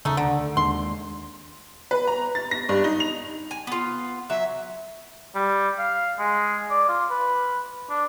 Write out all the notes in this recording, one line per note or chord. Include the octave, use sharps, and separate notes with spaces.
D#1 C#3 A3 D#4
D2 D3
D#2 G#3 D4 C6
B4
A#5
A6
A#6
G2
D#4
F7
G#5
B3 F4
F#3 E5
G3
F5
G#3
D5
F4
B4
D4